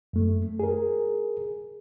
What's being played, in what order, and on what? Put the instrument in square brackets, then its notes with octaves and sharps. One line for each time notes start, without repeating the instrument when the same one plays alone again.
[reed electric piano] F#2 A3
G#4 A#4